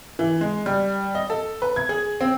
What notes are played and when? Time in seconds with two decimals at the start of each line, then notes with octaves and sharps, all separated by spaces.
0.19 E3
0.41 G#3
0.66 G3
1.15 D#5
1.30 A4
1.62 B4
1.76 G#6
1.89 G#4
2.21 C4